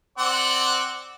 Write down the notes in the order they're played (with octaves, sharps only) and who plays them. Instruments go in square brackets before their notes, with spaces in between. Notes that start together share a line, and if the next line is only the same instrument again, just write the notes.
[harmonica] C4 D5 F#5